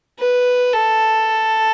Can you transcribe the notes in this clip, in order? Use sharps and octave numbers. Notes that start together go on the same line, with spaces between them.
B4
A4